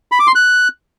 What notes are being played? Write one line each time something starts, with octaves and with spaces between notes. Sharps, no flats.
B5
D6
C6
F#6